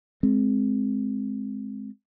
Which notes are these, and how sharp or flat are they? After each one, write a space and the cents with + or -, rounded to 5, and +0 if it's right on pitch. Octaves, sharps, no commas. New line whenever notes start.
G#3 +15 C4 +0